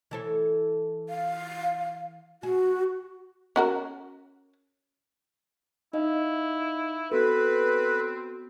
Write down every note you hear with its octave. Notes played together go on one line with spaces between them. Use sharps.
E3 A4 C#5
F5
F#4 G#4
C#4 F#4 A#4
D#4 E4 D#5 F5
B3 C4 F#4 A4 B4